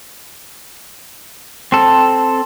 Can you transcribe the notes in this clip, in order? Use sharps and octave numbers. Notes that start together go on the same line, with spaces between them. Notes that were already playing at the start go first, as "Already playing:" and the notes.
C4 A4